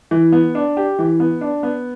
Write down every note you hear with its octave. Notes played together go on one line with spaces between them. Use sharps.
E3
B3
D4
G4
E3
B3
D4
B3